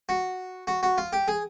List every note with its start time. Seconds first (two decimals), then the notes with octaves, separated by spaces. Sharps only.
0.09 F#4
0.67 F#4
0.83 F#4
0.98 F4
1.13 G4
1.28 G#4